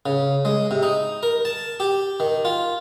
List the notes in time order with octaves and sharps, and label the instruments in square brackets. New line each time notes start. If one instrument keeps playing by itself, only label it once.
[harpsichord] C#3
G#3
C3
D#4
A#4
A5
G4
D#3
F4